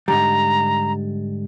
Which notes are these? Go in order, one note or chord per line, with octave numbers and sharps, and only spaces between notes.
G#2 D3 G3 A#5